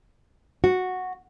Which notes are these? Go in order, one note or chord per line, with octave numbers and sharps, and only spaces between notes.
F#4